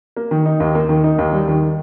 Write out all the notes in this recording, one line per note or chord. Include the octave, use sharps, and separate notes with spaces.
A#3
D#3
D#4
D#2
A#3
D#3
D#4
D#2
G3
D#3